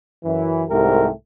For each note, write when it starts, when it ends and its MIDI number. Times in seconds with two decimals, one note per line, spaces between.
0.24 0.64 42
0.24 0.64 52
0.69 1.09 36
0.69 1.09 44
0.69 1.09 57
0.69 1.09 67
0.69 1.09 70